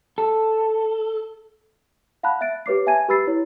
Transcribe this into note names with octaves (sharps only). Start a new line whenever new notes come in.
A4
F5 F#5 A5 B5 F#6
E5 F#6 A6 D7
G4 B4 C#5 D6 C7
E5 G#5 A5 G#6 D#7
G4 B4 B5 E6 A6 C7
E4 C#5